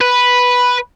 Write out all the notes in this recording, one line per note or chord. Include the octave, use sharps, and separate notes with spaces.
B4